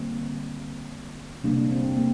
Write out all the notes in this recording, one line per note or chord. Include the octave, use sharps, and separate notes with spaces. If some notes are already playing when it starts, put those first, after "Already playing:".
Already playing: D3 G3 A#3 C4
C3 G3 A#3 D4
C4
A#3